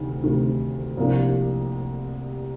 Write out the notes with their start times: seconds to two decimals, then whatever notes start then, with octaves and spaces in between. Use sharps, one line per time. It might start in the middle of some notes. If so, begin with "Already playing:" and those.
Already playing: D2 C3 D#3
0.24 D2 C3 D#3
0.97 C2 C3 F3 A#3 D4